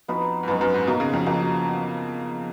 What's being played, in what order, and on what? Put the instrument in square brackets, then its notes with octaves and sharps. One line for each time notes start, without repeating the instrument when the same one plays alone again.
[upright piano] F2 [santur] B3 D#4 F#4 B4
[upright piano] G#2
[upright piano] F#2 [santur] B3 D#4 F#4 B4
[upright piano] F#2
G#2
[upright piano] B2 [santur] F#3 A#3 D#4 F#4
[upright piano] C#3
F2
[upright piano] F2 [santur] F#3 A#3 D#4 F#4